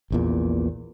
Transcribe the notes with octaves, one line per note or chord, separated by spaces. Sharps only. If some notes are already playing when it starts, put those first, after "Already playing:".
A#1 E2 A#2